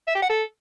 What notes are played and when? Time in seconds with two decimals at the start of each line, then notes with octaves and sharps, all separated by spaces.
0.08 E5
0.15 G4
0.22 F#5
0.29 A4